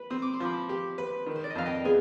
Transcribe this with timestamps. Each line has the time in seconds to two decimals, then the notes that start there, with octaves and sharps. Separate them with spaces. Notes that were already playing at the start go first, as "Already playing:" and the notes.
Already playing: B4 B5
0.10 C4 D#6
0.22 D6
0.33 C6
0.40 F3 B5 D6
0.69 G4
0.98 B4
1.26 D#3
1.36 C5
1.44 D5
1.50 D#5
1.55 F2 F5
1.66 D#5 G5
1.85 B3 F4 G#4